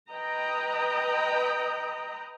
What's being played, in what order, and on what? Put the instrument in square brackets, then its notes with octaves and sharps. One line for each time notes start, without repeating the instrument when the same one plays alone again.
[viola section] B4 D#5 G5 A#5